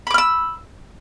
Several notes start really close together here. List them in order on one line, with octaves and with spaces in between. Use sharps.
B5 D6 F6 E6